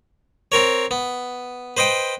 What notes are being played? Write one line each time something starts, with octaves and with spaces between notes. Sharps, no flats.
C4 A#4 C#5
B3
B4 C5 D#5 G5